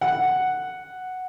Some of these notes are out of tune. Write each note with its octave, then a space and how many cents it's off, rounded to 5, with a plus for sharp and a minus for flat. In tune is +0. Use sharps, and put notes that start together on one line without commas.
F#5 +0